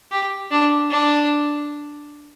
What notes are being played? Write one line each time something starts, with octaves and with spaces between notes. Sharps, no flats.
G4
D4
D4